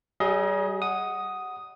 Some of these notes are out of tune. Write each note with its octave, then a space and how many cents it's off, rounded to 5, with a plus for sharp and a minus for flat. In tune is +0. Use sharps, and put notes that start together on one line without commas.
G3 -40 G#4 +0 D#5 +25
F#5 +0 D#6 +0